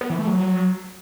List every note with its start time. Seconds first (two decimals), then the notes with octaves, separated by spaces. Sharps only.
0.01 B3
0.10 E3
0.19 A3
0.27 F#3